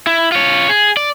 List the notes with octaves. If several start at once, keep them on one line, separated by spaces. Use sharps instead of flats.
E4
F4 C#5
G#4
D5